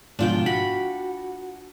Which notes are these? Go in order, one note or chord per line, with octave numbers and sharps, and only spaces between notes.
G#2 B2 F3 D4 F4 G5
F#4 B5